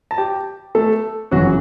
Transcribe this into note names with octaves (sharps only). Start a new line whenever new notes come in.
A5
G4 G5
A3 A4
G1 F#2 C#3 E3 F#3 F#4